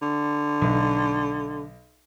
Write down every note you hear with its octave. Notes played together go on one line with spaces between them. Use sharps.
D3
B1